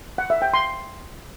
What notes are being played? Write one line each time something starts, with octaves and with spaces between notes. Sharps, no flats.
F#5
E5
G5
C6